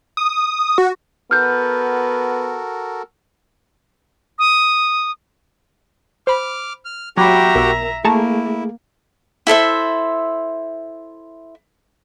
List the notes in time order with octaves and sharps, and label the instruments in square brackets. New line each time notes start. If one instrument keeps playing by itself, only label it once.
[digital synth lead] D#6
F#4
[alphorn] B3 [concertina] F#4 A4 A#4 [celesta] F6 G6
[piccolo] D#6
[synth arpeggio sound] C5 B5 [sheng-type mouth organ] D6 F6
[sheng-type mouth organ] F6
[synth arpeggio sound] F#3 [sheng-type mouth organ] F#4 G4 G5 [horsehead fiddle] E5 A#5 [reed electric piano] B5 D6
[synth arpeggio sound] B1 [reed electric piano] A#4 E6
[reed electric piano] A3 G#4 [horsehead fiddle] A#3 [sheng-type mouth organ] E4 [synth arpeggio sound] A5 A#5 C#6
[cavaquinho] E4 A4 C5 E5